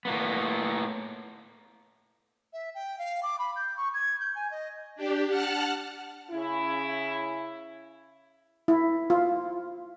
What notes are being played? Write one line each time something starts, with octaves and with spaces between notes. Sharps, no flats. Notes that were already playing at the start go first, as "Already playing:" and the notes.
A2 A#3 B3
E5
G5
F5
D6
B5
G6
C#6
G#6
G6
G#5
D#5
D4 G4
F#5 A5 F6 F#6
C#3 E4
E4
F4